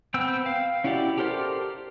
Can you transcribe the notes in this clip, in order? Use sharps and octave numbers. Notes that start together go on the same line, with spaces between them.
B3 C4 G5 E6
F5
C#4 E4 F#4 G4 D5
G4 A4 A#4 C5 D5